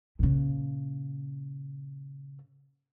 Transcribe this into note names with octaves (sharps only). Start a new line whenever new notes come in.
A#2 C#3